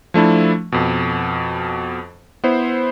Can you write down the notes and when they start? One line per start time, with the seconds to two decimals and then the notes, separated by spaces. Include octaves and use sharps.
0.14 F3 A3 D4 E4
0.72 F2 B2
2.44 B3 E4 C5